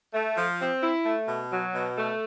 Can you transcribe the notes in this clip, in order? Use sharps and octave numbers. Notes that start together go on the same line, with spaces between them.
A3
F3
C4
E4
A3
B2
F#3
B2
A3